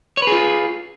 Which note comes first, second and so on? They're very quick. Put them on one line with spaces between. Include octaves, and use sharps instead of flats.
C#5 B4 G#4 F4